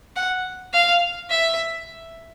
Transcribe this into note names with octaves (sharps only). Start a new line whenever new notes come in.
F#5
F5
E5